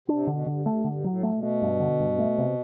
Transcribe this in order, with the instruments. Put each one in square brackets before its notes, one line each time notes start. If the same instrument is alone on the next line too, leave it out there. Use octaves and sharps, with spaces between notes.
[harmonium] C3 [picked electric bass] D4
[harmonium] A2
[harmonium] B2 [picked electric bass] D3
[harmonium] G2 [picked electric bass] D3
[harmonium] G2 [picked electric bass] A3
[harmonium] G2 [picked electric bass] D3
[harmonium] B2
[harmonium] A2 [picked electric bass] F#3
[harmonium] A2 [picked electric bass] A3
[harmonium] B2
[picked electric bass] A3
G2
D3
G2
A3
C3